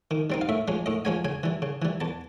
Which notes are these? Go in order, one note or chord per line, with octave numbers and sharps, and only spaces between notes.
D#3
G3 C4 D#4
F5
A2 E5
F3 G#3 C#4
A2 D#5
F3 G#3 C#4 G#5
C#3 G#5
E3 G3
C#3
E3 G3
E2 A5